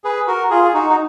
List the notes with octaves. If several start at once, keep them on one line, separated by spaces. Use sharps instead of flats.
G#4 B4
F#4 A#4
F4 G#4
G#4
D#4 F#4
D#4